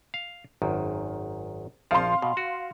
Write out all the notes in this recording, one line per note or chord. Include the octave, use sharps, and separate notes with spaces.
F5
G#1 F#2 D#3
A#1 F3 F5 C6
B2
F#4